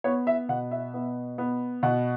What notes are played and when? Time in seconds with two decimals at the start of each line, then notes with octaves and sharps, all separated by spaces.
0.04 B3 C#5
0.27 E5
0.49 B2 F#5
0.71 E5
0.94 B3
1.38 B3
1.83 B2 F#5